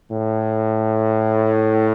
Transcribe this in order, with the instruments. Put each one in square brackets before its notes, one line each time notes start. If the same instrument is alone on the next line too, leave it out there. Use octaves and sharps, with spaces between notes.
[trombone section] A2